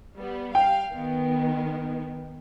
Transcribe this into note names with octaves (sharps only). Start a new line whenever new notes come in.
G3 B3
F5 G5
D#3 B3